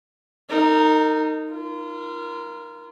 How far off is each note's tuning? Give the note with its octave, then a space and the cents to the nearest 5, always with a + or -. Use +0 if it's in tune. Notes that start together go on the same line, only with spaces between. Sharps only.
D#4 +0 A#4 -35
F4 -30 A#4 +15